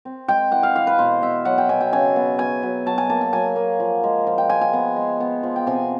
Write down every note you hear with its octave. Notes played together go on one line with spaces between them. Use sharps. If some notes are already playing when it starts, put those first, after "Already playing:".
C4
G#3 G5
E3 F#5
F5
E3 F5
B4
B2 C5
B2 E5
F#3 F#5
G5
B2 G#5
G5
C#3 G#5
B3
B3 G#5
F#3
F#3 A5
G#5
A#3 A5
A5
F#3 G#5
A#3
F3
G#3
F3
G5
G#3 G#5
G#5
B3
G#3
B3
F3
G5
C3 G#5